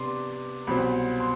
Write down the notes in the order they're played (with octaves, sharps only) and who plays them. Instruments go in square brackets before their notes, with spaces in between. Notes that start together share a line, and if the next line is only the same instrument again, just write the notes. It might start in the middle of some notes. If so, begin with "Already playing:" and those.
Already playing: [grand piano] C3 B3 D4 C6 D6
C2 B2 F#3 C4 B5
C6